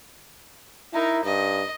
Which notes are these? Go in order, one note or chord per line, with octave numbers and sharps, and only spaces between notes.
D#4 E4 A#4
G2 D#5